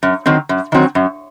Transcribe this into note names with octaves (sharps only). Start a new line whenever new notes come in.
F#2
D#3 F#3 C4
F#2
D#3 F#3 C4
F#2